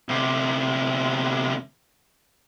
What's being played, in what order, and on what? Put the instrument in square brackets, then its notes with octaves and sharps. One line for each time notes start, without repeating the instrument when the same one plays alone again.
[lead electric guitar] D2 C3